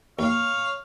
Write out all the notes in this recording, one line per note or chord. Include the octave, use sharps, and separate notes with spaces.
D#2 C#5 F5